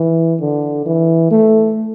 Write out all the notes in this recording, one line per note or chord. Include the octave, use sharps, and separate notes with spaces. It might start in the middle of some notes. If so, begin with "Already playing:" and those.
Already playing: E3
D3
E3
A3